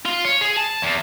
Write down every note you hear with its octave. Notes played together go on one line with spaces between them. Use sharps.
F4
C#5
G#4
A5
E2